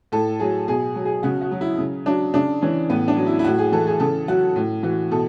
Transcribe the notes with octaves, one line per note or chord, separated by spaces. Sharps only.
A2 A4
F#3 G#4
B2 G#4
F#3
G#4
C#3 F#4
F#4
F#3
E4
C#3
F#3 D4
C#3 D4
E3 C#4
A2 B3
D4
F#3
E4
E4
A2 F#4
G#4
E3 A4
G#4
C#3 A4
F#3 F#4
A2
E3 F#4
B2 A4